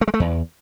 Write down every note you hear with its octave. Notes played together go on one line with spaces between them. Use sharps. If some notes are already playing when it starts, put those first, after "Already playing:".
A3
G#3
A3
E2